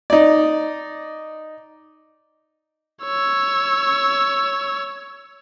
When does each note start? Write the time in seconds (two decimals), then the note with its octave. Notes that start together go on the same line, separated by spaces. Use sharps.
0.10 D#4 D5
3.04 C#5 E6